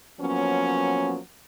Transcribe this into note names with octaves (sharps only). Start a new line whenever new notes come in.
F3 F#3 A#3 B3 C#4